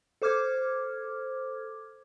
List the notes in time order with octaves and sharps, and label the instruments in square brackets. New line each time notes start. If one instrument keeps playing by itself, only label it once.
[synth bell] A4 C5 D6 F6 G#6